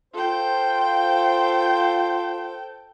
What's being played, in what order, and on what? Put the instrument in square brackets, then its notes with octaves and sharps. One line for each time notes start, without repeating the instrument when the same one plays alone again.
[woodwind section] F4 C5 [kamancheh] A4 G5